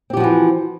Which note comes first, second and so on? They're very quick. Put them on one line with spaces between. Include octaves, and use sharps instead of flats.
C4 G4 F3 F#4 E3